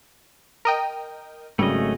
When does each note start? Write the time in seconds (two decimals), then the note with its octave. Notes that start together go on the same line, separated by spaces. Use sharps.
0.65 A#4 D#5 G5
1.59 G#1 C#3 F#3 G3 A3 C#4 D#5